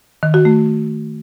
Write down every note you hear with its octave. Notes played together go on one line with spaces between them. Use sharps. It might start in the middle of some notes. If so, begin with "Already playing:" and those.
D#3
F#4
A3